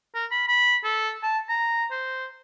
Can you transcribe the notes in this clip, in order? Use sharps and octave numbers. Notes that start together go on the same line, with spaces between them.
A#4
B5
B5
A4
A5
A#5
C5